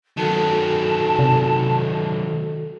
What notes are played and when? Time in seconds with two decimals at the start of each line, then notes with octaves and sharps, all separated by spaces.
0.17 D#3 F#3 F#4 A4 A5
1.19 C3